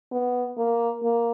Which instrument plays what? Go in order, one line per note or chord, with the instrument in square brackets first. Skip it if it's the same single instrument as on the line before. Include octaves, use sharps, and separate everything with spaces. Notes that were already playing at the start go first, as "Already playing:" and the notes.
[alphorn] B3
A#3
A#3